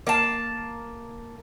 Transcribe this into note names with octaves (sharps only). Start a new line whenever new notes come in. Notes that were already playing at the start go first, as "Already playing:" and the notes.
A#3 F5 A5